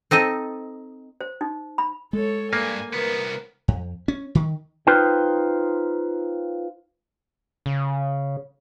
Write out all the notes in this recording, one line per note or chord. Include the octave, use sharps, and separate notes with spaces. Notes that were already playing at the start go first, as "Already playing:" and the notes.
C4 D#4 A4 D#5
C5
D#4
B5
G#3 A4 C#5
G2 A#3 G#5
C2 B3 A#4 B4
F2
C#4
D#3
D#4 F4 B4 C5 G5
C#3